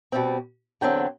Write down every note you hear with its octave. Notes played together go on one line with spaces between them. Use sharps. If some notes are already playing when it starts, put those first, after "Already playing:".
B2 G3 C4
E2 D3 F#3 C4 G5